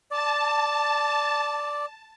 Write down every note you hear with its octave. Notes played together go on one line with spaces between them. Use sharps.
D5 A5